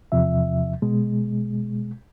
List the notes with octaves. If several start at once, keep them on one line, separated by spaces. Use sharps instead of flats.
E2 C3 F3 E5
B2 G#3